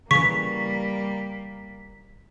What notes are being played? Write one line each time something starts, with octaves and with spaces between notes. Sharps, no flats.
C#3 E3 G3 A#3 C#6 B6